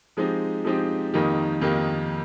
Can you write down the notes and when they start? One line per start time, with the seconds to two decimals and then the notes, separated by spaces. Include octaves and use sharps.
0.17 F3 G#3 C4 D#4 G4
0.65 F3 G#3 C4 D#4 G4
1.14 F2 D#3 A#3 D#4 G4
1.62 F2 D#3 A#3 D#4 G4